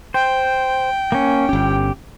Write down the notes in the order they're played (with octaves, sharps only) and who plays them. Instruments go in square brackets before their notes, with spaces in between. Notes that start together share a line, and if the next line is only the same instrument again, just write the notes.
[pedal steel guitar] C5 [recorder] G5
[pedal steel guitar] A#3 C#4
[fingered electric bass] G1 C#4 [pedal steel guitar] G4